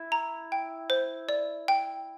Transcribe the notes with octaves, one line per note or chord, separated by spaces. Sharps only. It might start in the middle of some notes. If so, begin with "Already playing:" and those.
Already playing: E4
A#5
G5
C5
D5
G5